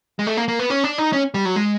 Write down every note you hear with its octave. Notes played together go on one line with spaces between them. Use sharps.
G#3
A3
A#3
A#3
B3
C#4
D4
D#4
C#4
G3
F#3
G#3